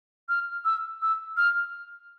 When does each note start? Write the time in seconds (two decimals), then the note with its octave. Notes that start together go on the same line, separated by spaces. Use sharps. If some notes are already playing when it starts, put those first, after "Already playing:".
0.29 F6
0.65 E6
1.02 E6
1.37 F6